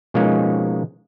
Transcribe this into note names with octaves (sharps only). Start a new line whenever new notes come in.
B2 F3 G#3 A#3 C#4 D#4